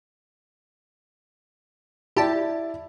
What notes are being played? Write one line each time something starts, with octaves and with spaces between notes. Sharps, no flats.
E4 G4 D5 A5